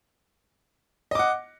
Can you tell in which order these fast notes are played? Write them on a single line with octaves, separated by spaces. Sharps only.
D#5 D6 F#5